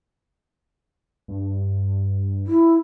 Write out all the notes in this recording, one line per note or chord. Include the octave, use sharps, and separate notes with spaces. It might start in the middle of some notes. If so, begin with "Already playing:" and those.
G2
E4